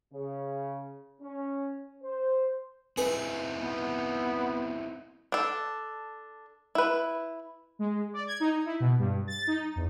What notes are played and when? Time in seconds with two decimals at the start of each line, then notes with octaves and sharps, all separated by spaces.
0.13 C#3
1.22 C#4
2.03 C5
2.97 C4 D#4 E4 G#4 B4
3.58 B3
5.32 D4 A4
6.75 E4 B4
7.79 G#3
8.13 D5
8.27 G#6
8.40 D#4
8.66 E4
8.80 B2
8.99 G2
9.27 A6
9.47 D#4
9.76 E2